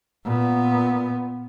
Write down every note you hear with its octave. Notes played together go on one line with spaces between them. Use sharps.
A#2 B3